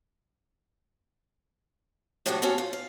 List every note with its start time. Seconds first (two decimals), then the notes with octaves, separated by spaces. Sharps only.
2.26 A2 C3 F#3 G3 D4 F#4
2.42 C#4 F#4 A4 C5
2.58 F4
2.73 F5